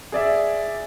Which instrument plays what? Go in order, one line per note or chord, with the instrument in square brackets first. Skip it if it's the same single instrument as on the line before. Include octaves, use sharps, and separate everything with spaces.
[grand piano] G#4 D5 E5